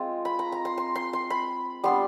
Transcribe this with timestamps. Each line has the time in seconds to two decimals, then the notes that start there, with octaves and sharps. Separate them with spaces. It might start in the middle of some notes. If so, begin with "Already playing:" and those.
Already playing: G#3 C4 F4
0.25 B5
0.39 A#5
0.52 A#5
0.65 C6
0.78 C6
0.95 C6
1.13 C6
1.30 B5
1.84 G3 B3 D4 C6